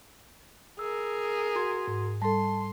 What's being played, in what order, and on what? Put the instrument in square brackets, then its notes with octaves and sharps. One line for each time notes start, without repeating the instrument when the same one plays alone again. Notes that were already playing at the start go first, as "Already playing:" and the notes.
[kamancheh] G#4 A#4 [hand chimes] E6
[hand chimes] F#4 C6 G#6
[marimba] G#2
[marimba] G3 A4 [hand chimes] A5 [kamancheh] C6